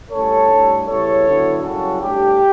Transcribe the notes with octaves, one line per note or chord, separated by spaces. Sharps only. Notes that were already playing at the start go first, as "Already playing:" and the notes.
A2 G3 C#4 A4 C#5
A2 G3 D4
C#3 G3 B3 E4 A4 C#5
D3 F#3 B3 E4
F#2 C#3 G3 C#4 E4 F#4 A4
A2 G3 D4 G4